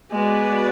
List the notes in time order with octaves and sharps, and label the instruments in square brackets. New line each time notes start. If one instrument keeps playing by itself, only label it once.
[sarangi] G#3 [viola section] B3 F#4 B4 D5